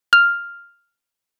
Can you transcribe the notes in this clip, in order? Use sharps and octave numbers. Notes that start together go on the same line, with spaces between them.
F6